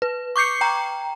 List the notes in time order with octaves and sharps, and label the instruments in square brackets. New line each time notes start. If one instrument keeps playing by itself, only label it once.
[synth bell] B4
C#6 D6 G6 C7 C#7
G5 A#5